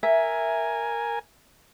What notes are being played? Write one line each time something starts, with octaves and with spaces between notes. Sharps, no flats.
A#4 E5 G#5